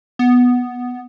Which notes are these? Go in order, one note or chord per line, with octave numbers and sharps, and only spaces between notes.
B3